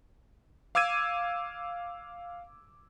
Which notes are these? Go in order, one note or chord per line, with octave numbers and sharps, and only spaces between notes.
F5 D6 E6 G#6 D#7